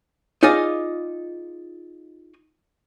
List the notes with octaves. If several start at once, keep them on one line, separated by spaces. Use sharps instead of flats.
D#4 F4 G#4 D5 D#5 F5